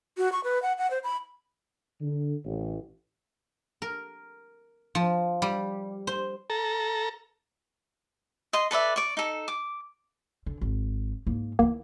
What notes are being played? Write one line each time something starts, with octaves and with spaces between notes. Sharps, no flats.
F#4
C#6
B4
F#5
F#5
C5
B5
D3
A1
A#4
F3
G3
C5
A4 A#5
D#5 C6
A4 B4 D5 E5
D5 C#6
D#4 A4
D6
D3
G#1
G#2 A#3
D#3 E3 A#3